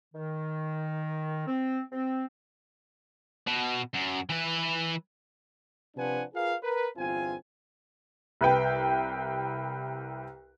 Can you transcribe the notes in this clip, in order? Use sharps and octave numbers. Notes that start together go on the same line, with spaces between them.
D#3
C4
C4
B2
F#2
E3 B4
C3 F3 D4 B4 F#5 G#5
F4 G#4 A#4 B4 F5
A#4 B4
G1 E2 C4 F4 G#5
C2 B4 G5